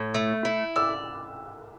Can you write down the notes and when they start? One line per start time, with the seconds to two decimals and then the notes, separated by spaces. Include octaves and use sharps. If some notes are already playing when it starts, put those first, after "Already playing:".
Already playing: A2
0.14 A3
0.45 E4
0.76 D5 E6